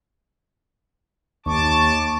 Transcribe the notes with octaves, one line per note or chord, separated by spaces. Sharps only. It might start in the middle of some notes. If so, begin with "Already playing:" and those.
D#2 A5 C#6 D6